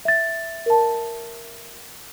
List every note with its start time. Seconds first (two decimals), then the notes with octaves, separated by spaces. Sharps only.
0.05 E5 A6
0.66 A#4 A5